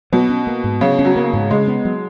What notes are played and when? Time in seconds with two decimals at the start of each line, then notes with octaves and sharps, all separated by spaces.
0.12 B2 F#3
0.30 C#4
0.47 A#3
0.64 G#2
0.81 C#3 F#3
0.99 C#4
1.05 F#3
1.16 A#3
1.33 G#2
1.51 C#3 G#3
1.68 B3
1.85 F#3